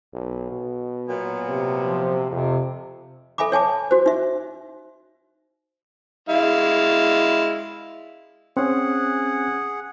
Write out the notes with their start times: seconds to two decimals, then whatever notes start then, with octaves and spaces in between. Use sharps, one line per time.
0.13 B1
0.51 B2
1.09 A#2 F#3 B3
1.49 C3
1.80 F3
2.32 F2 C3
3.38 A4 E5 G#5 B5 D6
3.52 C#5 G#5 A5 D6
3.91 F#4 C5
4.06 D#4 E5
6.29 G#3 E4 F5
8.57 C4 C#4 G#4 F#5